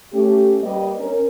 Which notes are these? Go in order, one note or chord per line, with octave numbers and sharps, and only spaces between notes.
A3 C#4 G4
G3 A#3 G4 B4 D#5
C#4 A#4